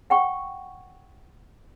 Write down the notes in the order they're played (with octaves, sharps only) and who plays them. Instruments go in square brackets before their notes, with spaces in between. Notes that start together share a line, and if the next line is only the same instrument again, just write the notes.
[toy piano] F#5 G5 C#6